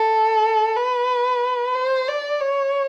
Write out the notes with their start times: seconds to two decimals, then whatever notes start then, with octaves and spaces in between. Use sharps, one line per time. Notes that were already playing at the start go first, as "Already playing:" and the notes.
Already playing: A4
0.76 B4
1.75 C5
2.08 D5
2.41 C#5